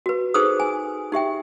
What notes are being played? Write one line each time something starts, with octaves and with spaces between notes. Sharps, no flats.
F#4 B4
D#4 G#4 A4 B4 C5 D#6
G#5
D#4 G4 E5 G5